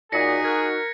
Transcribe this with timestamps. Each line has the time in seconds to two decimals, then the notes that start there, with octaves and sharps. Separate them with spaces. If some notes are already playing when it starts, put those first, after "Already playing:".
0.12 A#2 D#4 F#4 G#4 A#6 B6 C#7
0.45 A#4 F#6 G#6